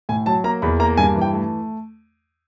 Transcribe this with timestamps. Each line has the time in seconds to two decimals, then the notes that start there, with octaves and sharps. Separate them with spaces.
0.09 A2 G#5
0.26 F#3 A5
0.44 A#3 A#5
0.62 E2 B5
0.80 A#3 A#5
0.98 G2 G#5
1.15 E3
1.22 G5
1.34 A3